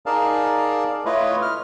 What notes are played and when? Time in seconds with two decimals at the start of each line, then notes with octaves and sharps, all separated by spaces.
0.06 D#4 G#4 A#4 D5 F5 A5
1.06 A3 E4 F4 B4 C#5 D#5
1.42 F6